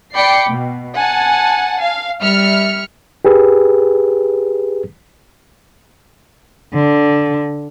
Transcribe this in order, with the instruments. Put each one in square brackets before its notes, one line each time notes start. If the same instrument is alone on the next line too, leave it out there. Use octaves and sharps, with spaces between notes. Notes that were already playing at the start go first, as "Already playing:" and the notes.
[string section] D5 G5 B5 D6 C7 C#7
B2
F#5 G#5 A5
F5
G3 E5 F6 C#7
[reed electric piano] G4 G#4 B4
[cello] D3